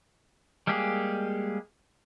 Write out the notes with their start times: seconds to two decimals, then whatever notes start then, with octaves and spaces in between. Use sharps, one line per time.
0.67 G3 G#3 A#3 G4 G#4